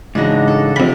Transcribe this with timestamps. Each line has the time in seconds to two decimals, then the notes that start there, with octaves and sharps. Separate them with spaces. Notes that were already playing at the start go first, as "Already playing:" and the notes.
0.15 G#2 C#3 E3 D4 D#4 F#4
0.48 A4
0.76 F2 C3 A3 B5